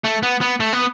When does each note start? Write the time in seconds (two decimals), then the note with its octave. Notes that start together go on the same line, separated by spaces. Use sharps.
0.05 A3
0.23 B3
0.41 B3
0.60 A3
0.73 B3